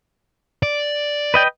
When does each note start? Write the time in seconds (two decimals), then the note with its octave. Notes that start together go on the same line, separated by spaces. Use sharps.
0.63 D5
1.34 B4 D#5 G5